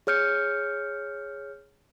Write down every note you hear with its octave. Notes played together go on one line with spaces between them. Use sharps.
G#4 C#5 F6 G6 C#7